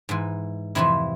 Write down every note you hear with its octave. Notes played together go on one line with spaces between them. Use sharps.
G#2 E3
F2 C3 E3 E4